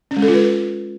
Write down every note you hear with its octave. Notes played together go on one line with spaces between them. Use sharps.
C#4
G#3
A4
F4
B4